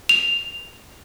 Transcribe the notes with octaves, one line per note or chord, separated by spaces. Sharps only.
F7